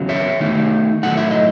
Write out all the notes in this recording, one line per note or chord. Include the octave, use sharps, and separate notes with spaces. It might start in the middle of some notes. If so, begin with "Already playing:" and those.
Already playing: E2 C#3 F#3
C#5 E5
D#3 A3 D#4
A2 F#3 A3 D#4 F#5
E5
D#5